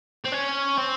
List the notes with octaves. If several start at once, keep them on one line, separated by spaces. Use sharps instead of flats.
C4
C#4
C4